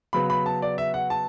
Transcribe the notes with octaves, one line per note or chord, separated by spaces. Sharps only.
C#3 F#3 B3 B5
B5
A5
D5
E5
F#5
A5